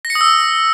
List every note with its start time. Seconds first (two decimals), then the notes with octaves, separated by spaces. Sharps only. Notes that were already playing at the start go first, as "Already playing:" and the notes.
0.05 A#6
0.10 C#7
0.15 D#6
0.21 E6